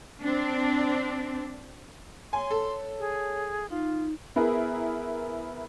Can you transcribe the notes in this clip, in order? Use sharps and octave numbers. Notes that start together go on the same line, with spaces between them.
C4 D4
C#5 G#5 C6
A4
G#4
D#4 F4
B3 E4 G#4 A#4